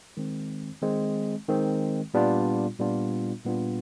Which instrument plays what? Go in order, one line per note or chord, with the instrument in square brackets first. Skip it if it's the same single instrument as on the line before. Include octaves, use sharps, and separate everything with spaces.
[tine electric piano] D#3 G#3 C4
D#3 G#3 C4
D#3 G#3 C4
A#2 G3 B3 D4 F4
A#2 G3 B3 D4 F4
A#2 G3 B3 D4 F4